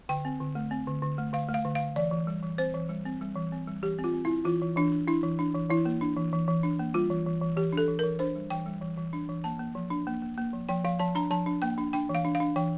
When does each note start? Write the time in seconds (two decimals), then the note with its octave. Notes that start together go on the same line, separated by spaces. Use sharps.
0.09 D3 G5
0.25 C4
0.40 D3
0.55 A3
0.71 C4
0.87 D3
1.02 D3
1.18 A3
1.33 D3 F5
1.49 A3
1.54 F5
1.65 D3
1.75 D3 F5
1.96 E3 D5
2.11 E3
2.27 G3
2.42 E3
2.58 C4 C5
2.74 E3
2.89 G3
3.05 C4
3.21 G3
3.36 E3
3.52 C4
3.67 G3
3.83 E3 G4
3.98 C4
4.04 F4
4.14 C4
4.25 C4 E4
4.45 E3 F4
4.61 E3
4.76 E3 D4
4.92 D4
5.08 D4 E4
5.23 E3
5.39 D4
5.54 E3
5.70 E3 E4
5.85 A#3
6.01 D4
6.17 E3
6.33 E3
6.48 E3
6.63 D4
6.79 A#3
6.94 G3 F4
7.10 E3
7.26 E3
7.42 E3
7.56 E3 G4
7.73 D4 A4
7.88 E3
7.99 E3 A#4
8.19 D4 C5
8.36 G3
8.50 E3 G5
8.66 G3
8.82 E3
8.98 E3
9.13 D4
9.29 E3
9.44 A#3 A5
9.59 A#3
9.75 F3
9.90 D4
10.07 A#3
10.22 A#3
10.38 A#3
10.53 F3
10.69 F3 G5
10.84 F3 F5
10.99 F3 A5
11.15 D4 A#5
11.31 F3 A5
11.46 D4
11.62 A#3 G5
11.78 D4
11.93 D4 G5
12.09 E3
12.15 F5
12.25 D4
12.35 F5
12.40 D4
12.56 E3 G5